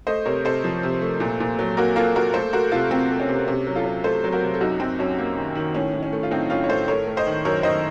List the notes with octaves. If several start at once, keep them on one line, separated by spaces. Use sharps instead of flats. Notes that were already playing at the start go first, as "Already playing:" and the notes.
A3 C5 D#5
C3 A#4 C#5
C3 A4 C5
F3
C3
A3
A#2
A#2
F#3
A#3 F#4 A#4
A#3 F4 A4
A#3 F#4 A#4
A3 A4 C5
A3 F#4 A#4
C3 F4 A4
A3 C4
A3
C#4
C3
C3 C#4
F#3
F4 A4
F#3
A3 A4 C5
F#3
F#4 A#4
C3
A4
F#2 D#4 F#4
F#2 C4
F#2 C#4
A#3
D#3
D#3
A2 C#4
A2
C#4
A3
F4
A2 C4 D#4
A2 C#4 F4
C#5
A2 A4 C5
A3 A#4 C#5
A3
C5 D#5
D#3
F#2 A#4 C#5
D#3 C5 D#5